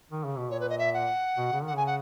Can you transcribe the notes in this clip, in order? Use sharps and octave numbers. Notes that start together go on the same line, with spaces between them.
D#3
C#3
B2
A#2 C#5
B4
D#5
E5
F#5
B2
C#3
D#3 F#5
C#3 G#5
F#5